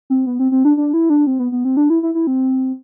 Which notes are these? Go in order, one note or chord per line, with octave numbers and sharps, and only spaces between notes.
C4
B3
C4
C4
D4
D4
E4
D4
C4
B3
B3
C4
D4
E4
E4
E4
C4